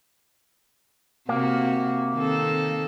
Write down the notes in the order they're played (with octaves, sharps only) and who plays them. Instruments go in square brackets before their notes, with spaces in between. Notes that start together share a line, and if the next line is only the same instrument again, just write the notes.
[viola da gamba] C3 F#4 [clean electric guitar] A#3
[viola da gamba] D#3 C4 A4